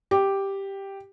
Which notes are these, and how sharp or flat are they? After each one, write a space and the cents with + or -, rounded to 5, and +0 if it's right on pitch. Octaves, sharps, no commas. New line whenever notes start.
G4 +0